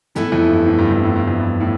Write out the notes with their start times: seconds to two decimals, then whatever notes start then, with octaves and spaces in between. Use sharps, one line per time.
0.15 A2 E3 B3 E4 A4
0.32 F2
0.49 G2
0.66 A2
0.78 G2
0.91 F2
1.03 A2
1.16 G2
1.27 F2
1.40 G2
1.60 A2